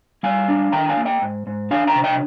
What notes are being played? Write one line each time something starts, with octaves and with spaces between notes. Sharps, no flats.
G3 F5 G#5
D4
D#3 G5 A#5
F5 G#5
A#3
D#5 G5
G#2
G#2
D4 F5 G#5
G5 A#5
C3
D#5 G5